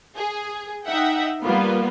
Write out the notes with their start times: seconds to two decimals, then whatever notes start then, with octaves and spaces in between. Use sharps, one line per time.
0.17 G#4
0.85 D#4 E5 F#5 G5
1.42 G3 A#3 B3 F4